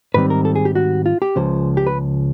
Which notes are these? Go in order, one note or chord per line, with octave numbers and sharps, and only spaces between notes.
G#2 D#3 G3 C4 B4
A#4
A4
G#4
G4
F#4
F4
G4
C#2 C#3 F3 C5
G4
B4